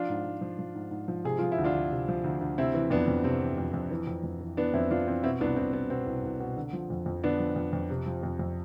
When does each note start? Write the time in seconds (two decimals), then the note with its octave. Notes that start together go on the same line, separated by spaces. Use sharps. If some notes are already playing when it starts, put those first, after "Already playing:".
Already playing: F3 D4 F4
0.09 G#2
0.25 G#2
0.41 F3
0.59 F3
0.75 G#2
0.91 G#2
1.08 F3
1.24 C3 G#4
1.38 F3 F4
1.52 E4
1.58 D2
1.64 D4 F4
1.74 D2
1.91 C3
2.09 F3
2.24 D2
2.41 D2
2.58 C3 C4 E4
2.74 E3
2.90 F2 B3 D4
3.08 F2
3.24 C3 C4
3.41 E3
3.58 F2
3.74 F2
3.91 E3
4.07 F2
4.24 F2
4.41 E3
4.57 E3 B3 D4
4.74 F2 C4 E4
4.91 F2 D4 F4
5.07 E3 C4
5.23 B2 C4 E4
5.40 C2 B3 D4
5.56 C2 C4
5.73 B2 B3
5.90 B2 C4
6.06 C2
6.24 C2
6.40 B2
6.57 D3
6.73 F3
6.90 F2
7.06 F2
7.24 D3 B3 D4
7.40 F3
7.56 F2
7.73 F2
7.90 C3
8.06 F3
8.23 F2
8.39 F2